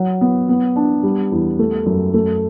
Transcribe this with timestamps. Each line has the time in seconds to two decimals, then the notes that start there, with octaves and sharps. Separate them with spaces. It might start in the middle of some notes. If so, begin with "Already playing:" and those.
Already playing: F#3
0.21 B3
0.49 B3
0.76 D4
1.03 G3
1.31 E2
1.59 A3
1.86 F#2
2.14 A3